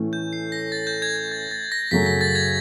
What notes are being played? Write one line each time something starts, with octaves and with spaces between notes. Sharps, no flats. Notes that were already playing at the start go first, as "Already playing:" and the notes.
Already playing: A2 E3 A3 C#4
G6
C7
A#6
A6
G6
G#6
G#6
A6
A6
A#6
F#2 C#3 F#3 A3 B6
A#6
A6
G#6